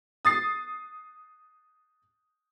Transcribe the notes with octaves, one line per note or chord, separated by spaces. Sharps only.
D#6 A6 C7